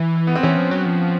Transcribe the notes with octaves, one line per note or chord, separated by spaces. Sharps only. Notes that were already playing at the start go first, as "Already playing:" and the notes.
Already playing: E3
B3
C4
E3 C#4
F3
F#3
F3